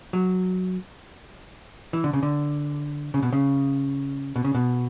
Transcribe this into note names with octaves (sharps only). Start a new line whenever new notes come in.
F#3
E3
D3
C#3
D3
C#3
B2
C#3
B2
C#3
B2